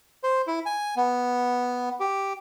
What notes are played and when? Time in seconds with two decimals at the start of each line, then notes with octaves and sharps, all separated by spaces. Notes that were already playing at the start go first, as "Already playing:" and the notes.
0.23 C5
0.47 E4
0.66 G#5
0.97 B3
2.00 G4